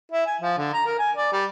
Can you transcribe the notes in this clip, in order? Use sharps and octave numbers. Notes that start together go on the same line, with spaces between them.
E4
G#5
F3
D3
A#5
A#4
G#5
D5
G3